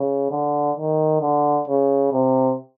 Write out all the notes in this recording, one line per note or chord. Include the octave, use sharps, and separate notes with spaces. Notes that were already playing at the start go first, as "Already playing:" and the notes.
Already playing: C#3
D3
D#3
D3
C#3
C3